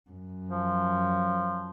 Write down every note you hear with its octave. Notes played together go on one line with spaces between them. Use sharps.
F#2
F3